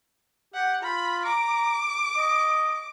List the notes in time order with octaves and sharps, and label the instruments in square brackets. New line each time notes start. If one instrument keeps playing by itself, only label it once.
[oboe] G4 [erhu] F#5
[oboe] F4 [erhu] B5
[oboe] A#5 [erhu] D6
[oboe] D#5